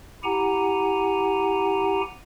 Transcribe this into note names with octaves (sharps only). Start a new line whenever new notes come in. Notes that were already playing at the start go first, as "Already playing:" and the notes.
E4 G4 F#5 G#5 A#5